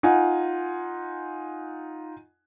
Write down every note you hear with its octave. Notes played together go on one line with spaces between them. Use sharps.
D#4 F4 F#5 G#5